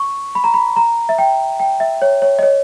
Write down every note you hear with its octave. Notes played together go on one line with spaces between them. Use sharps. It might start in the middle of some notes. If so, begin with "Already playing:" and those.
Already playing: C#6
B5
A#5
B5
A#5
E5
G5
G5
E5
C#5
C#5
D#5
C#5